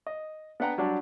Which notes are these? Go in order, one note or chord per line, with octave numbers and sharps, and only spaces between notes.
D#5
B3 D4 B4 F#5 G5 A#5
F#3 G3 D4 G4